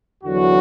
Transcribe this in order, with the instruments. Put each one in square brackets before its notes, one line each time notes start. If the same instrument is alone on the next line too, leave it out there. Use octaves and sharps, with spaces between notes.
[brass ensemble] E2 D3 F#3 F#4